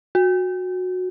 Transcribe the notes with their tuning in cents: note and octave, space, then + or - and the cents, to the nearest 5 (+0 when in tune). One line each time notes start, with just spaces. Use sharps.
F#4 -15